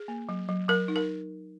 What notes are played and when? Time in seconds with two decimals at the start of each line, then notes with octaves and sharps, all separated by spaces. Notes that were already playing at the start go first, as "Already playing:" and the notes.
Already playing: G#4
0.08 A#3
0.29 F#3
0.49 F#3
0.68 F#3 A#4
0.88 D#4
0.96 A#4